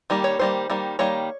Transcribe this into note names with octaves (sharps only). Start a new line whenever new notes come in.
D#3 G3 A#3
C#5
D#3 G3 A#3 C5
D#3 G3 A#3
D#3 G3 A#3 C#5